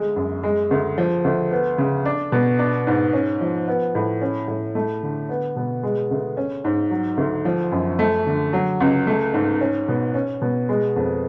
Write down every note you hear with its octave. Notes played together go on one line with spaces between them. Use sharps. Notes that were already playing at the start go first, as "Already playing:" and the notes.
Already playing: D2 G#3
F#2
G#3
D2
F3
D2
B3
C#3
D4
B2
D4
G#2
C#4
F3
B3
A2
C#4
A2
A3
D3
B3
B2
G#3
D2
C#4
G#2
F#3
D2
F3
F#2
A3
D3
F#3
C#2
A3
G#2
C#4
B2
C#4
B2
G#3
F2